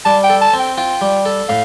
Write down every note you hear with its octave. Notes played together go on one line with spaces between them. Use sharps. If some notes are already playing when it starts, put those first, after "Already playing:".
G3 A5
G5
A4
A5
C4
G5
F4 G5
G3
A4
A2 F5